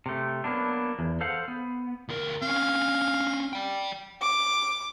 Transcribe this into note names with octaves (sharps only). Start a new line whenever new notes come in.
C3 A3
F#3 A#3 B3 D4
E2
A4 C5 F5 F#5
B3
D2 A#4
C4 C#4 F5
D5 G5
D6